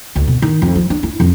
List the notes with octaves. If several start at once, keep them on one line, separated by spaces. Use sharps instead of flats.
D2
B2
D#3
F2
F3
D4
E4
F2